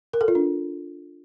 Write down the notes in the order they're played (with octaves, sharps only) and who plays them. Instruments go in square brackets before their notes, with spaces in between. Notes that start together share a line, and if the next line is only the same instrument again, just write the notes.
[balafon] A#4
A4
F4
D4